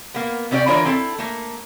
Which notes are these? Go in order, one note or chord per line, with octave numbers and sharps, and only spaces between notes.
A#3 B3
C3 C4 C#4 F#4 D5 G5
D3 E3 F4 A#4 C#5 D5
C4 E4 A4
A3 A#3